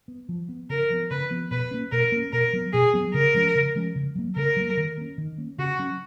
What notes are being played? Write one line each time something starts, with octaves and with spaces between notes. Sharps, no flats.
B3
F3
B3
C#3 A#4
F3 B3
C#3 B4
F3 B3
B2 B4
A#3 C#4
B2 A#4
A#3 C#4
B2 A#4
F#3 B3
B2 G#4
F#3 B3
C#3 A#4
F3 G#3 C#4
C#3
F3 G#3 C#4
C#3
F#3 A#3
C#3 A#4
F#3 A#3
D#3
A#3 C#4
D#3
A#3 C#4
C#3 F#4
F#3 C#4